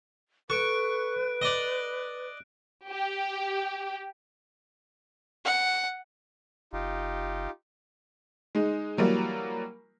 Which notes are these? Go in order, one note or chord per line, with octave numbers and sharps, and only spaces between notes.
A4 B4 C#6 F#6 D7
D5 D#5
G4
F#5
F#1 D#4 F4 G4
G#3 D#4
E3 F#3 G3 A#3